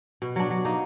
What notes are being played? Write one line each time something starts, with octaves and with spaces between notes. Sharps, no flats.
B2
F#3 D4
F#3
A#3 D#4